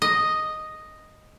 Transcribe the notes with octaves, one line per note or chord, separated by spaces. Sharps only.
D#5